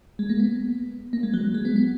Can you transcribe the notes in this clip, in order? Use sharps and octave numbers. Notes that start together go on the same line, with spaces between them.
G#3
A#3
B3
A#3
G#3
F#3
F#3
G#3
B3
B3